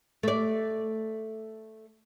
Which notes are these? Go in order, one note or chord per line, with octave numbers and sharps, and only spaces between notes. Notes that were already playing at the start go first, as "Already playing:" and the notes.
A3 D5